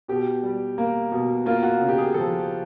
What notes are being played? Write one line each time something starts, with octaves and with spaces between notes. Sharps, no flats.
B2 G4
G3
A#3
B2
A#3 F4
F#4
C#3
G4
G#4
F3 A4